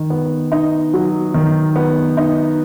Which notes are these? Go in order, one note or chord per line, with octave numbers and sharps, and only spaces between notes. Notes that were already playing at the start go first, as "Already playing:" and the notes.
Already playing: D#3
B3
D#4
F#3
D#3
B3
D#4